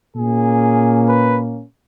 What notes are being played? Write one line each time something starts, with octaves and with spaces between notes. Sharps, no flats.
A#2 A#3 C#4 G#4
B4